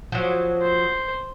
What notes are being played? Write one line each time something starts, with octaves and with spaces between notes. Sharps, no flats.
F3 F#3
C5